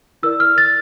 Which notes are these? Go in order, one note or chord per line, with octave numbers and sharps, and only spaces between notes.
E4 A#4 D5 E6
F6
A6